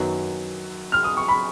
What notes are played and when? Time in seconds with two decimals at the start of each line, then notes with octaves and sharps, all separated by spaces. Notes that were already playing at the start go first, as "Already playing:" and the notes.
Already playing: F#2 D#3 F#3 B3
0.92 F6
1.04 D#6
1.17 C#6
1.28 B5